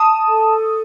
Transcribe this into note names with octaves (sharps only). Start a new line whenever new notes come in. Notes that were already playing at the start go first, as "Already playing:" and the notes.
Already playing: A5 D#6
A4